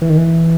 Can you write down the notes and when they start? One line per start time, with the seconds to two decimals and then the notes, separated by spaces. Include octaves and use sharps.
0.02 E3
0.09 D#3
0.17 E3